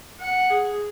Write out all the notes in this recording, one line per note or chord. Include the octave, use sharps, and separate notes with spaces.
F#5
G#4